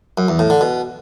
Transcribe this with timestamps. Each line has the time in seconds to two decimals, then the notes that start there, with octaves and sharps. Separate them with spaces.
0.18 F#2
0.28 E2
0.39 A2
0.50 D3
0.61 B2